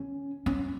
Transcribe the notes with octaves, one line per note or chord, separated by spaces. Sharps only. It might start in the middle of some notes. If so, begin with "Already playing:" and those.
Already playing: C#4
C#4